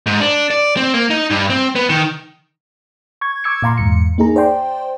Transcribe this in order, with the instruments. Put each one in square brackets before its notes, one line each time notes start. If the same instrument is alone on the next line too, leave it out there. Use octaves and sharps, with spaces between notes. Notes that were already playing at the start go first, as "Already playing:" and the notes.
[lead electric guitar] G#2
D4
D5
C4
A#3
D#4
G2
C4
B3
D#3
[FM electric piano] C#6 G#6
D6 E6 G#6 C#7
A#2 F5 A#5 C6
E2 G#2 C#7
A#3 D#4 G#4 A#5
C5 D5 G5 C6